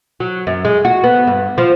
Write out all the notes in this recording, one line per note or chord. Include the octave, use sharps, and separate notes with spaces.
F#3
F#2
G#3
F#4
B3
G2
F3